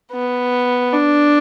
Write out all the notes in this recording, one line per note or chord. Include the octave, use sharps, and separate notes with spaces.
B3
D4